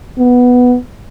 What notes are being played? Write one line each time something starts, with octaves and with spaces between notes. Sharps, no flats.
B3